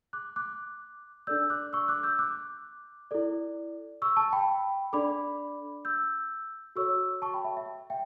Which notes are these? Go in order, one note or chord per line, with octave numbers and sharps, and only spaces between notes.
D6 F#6
D6 F#6
D4 A4 D5 E6 G6
D6 F#6
C#6 E6
D6 F#6
E6 G6
D6 F#6
E4 A4 D5
C#6 E6
A5 C#6
G5 B5
D4 A4 D5 B5 D6
E6 G6
F#4 A4 C#5 C#6 E6
A5 C#6
G5 B5
E5
E5
E5 G5